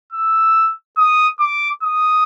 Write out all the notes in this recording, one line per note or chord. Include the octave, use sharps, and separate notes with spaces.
E6
D#6
D6
D#6